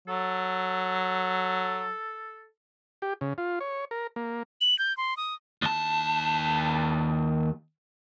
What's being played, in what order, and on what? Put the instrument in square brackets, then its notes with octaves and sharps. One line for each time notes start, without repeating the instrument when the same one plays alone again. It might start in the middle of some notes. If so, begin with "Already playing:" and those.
[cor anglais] F#3 [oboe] A4
[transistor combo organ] G4
C#3
F4
C#5
A#4
A#3
[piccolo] F#7
G6
C6
D#6
[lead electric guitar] D#2 A5